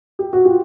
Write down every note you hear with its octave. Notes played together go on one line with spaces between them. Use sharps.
G4
F#4
F4 G4